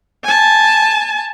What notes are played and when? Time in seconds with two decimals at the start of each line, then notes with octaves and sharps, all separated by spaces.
0.24 G#5 A5